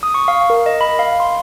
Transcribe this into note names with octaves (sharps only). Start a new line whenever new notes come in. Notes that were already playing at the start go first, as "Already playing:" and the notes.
D#6
C#6
F5
A#4
D#5
B5
F5
C6